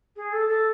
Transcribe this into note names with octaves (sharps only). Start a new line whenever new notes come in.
G#4
A4
A4